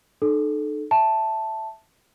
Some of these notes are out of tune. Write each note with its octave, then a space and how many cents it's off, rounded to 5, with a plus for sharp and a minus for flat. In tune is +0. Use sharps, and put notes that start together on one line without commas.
D#4 -40 A4 -20
E5 +0 A5 +0